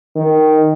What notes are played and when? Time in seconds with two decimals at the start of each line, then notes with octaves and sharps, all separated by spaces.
0.16 D#3